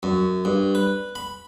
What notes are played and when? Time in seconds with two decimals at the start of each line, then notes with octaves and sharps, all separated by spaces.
0.03 F#2
0.45 G2
0.75 B4
1.15 B5